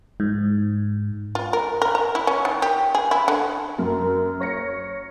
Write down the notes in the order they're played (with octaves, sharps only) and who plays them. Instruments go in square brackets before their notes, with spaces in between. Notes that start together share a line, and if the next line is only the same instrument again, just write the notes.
[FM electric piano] G#2
[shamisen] F4
A#4
A#4
A#5
E4
C#4
D#3
G4
G#4
E4
D3
[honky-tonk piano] F#2 [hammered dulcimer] A#4
[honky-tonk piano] C#5 A#6 C#7